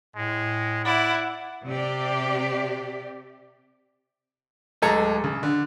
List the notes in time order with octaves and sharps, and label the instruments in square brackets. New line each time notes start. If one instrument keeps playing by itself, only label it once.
[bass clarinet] A2 [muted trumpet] G#3
[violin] E4 [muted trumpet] D5 [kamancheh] F#5
[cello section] C3 G4 D5
[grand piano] D1 G#3 A4 A#5 G#6
C#3
D3